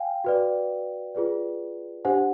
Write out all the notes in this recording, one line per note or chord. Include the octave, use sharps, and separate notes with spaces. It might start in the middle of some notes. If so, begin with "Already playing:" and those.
Already playing: F5 G5 G#5
F#4 B4 D5
F4 G#4 B4 D5
D4 G4 C5 F#5 G#5